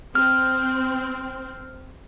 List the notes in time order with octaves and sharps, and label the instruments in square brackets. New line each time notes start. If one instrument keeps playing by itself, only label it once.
[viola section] C4 [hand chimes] F6